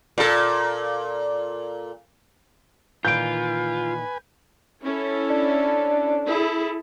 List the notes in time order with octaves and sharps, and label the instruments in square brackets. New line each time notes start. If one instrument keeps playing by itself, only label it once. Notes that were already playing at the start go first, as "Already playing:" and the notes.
[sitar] A#2 A4
[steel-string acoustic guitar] A#2 D#3 E3 [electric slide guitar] F4 [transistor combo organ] B4 G#5 [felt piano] G6 D7
[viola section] C#4 E4 A4
[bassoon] D4
[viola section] E4 G#4 A4